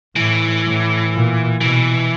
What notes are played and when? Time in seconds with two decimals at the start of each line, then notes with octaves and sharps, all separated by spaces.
0.16 A2 E3
0.65 A2
1.13 A#2
1.61 B2 E3